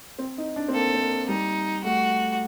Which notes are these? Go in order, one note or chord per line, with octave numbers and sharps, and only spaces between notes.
C4
D#4
D4
C4
A#3 A4
C4
A#3
G3 D#4
A3 F#4